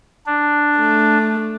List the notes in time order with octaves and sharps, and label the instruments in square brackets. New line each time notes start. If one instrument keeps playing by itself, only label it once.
[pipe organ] D4
[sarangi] A3